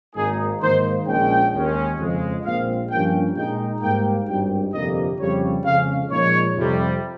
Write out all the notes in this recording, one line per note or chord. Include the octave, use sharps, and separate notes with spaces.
G#1 G#2 D#3 A#3 D#4 G#4
G#2 D#3 A#3 D#4 C5
A#1 A#2 G#3 C#4 G5
D#2 D#3 G#3 C#4
F2 C#3 G#3
A#1 A#2 G#3 C4 F5
G2 F3 A#3 C#4 G5
A#2 G#3 D#4 G5
G#2 G3 A#3 G5
G#1 G2 D#3 G3 G5
G1 F2 C3 G3 A#3 D#5
F2 C#3 G3 C#5
F2 C#3 G#3 C#4 F5
A#2 F3 G#3 D#4 C#5
F2 C3 G3